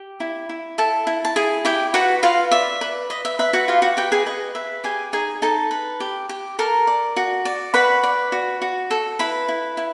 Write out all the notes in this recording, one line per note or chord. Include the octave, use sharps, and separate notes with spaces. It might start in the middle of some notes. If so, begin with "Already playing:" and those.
Already playing: G4
E4
E4
E4 A4 A5
E4
A5
E4 G#4 G#5
E4 G4 G5
F#4 B4 F#5
F4 B4 F5
D5 E5
B4
B4 D#5
E5
B4 E5
F#4 F#5
F4 G4 F5
F#4 F#5
G4 B4 G5
G#4 G#5
B4 D#5
B4 E5
G4 G#4 G#5
D#4 G#4 G#5
D#4 A4 A5
B4
G4
G4
A4 A#4 A#5
D5
F#4
D5
F#4 B4 B5
D5
F#4
F#4
A4
E4 B4 B5
E4
E4